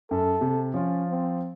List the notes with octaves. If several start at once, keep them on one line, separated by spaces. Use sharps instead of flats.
F#2 A4
C3
F3 C#4 F4
C4